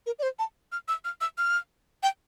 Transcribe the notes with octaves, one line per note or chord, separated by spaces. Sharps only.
A#4
D5
C5
A5
F6
E6
F6
E6
F6
G5